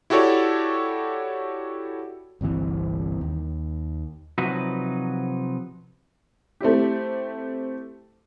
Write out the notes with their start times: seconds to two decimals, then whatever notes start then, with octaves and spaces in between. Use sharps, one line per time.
0.10 E4 F#4 G4 A4 C#5 D5
2.41 G1 C2 C3 E3
3.21 D#2
4.38 C3 F3 F#3 D#4 F#4 B4
6.61 A3 C4 E4 G4